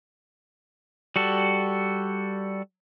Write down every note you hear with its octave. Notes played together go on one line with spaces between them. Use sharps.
G3 F#4 A4